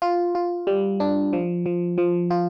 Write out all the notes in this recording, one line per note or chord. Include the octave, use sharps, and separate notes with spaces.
F4
F4
G3
D4
F3
F3
F3
F4